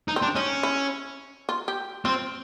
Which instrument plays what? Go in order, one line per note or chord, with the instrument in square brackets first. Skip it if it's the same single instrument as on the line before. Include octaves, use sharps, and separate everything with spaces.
[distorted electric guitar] D#4
[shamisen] C4
[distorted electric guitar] D4
[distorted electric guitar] C#4 [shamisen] D#4
[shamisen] E4
F4
G4
[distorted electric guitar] C4 [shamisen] F4